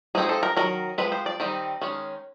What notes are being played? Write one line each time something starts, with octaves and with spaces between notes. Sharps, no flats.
F3 G#3 C4 D#4 G#4
A4
A#4
D#3 F#3 A#4
F3 G#3 C4 B4
C5
D5
D#3 G3 C4 D#4
D#3 G#3 C#4